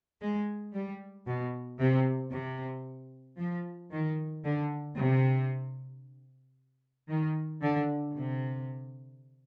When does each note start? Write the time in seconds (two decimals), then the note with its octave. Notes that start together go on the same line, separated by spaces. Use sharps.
0.21 G#3
0.74 G3
1.27 B2
1.80 C3
2.32 C3
3.38 F3
3.92 D#3
4.44 D3
4.97 C3
7.09 D#3
7.61 D3
8.14 C3